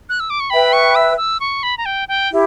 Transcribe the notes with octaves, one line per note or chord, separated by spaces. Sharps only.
F#6
E6
D6
C#6
B4 E5 G5 B5
C#6
E6
E6
C#6
B5
A#5
G5
G5
E4 G4